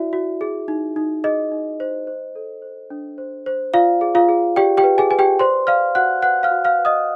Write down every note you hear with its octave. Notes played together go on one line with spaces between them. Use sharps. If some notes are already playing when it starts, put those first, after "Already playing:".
Already playing: E4 F#4 D5 E5
F#4
G#4
D#4
D#4
G#4 D#5
D#4
C5
C5
A4
C5
D4
C5
C5
F4 D5 F5
G#4
F4 F5
G#4
G4 D5 G5
G4 G5
B4
G#4 G#5
B4 G#5
G4 G5
C5 D5 C6
D5 F5 F6
F#4 F#5 F#6
B4 F#5 F#6
F5 F6
F#4
F5 F6
B4
D#5 D#6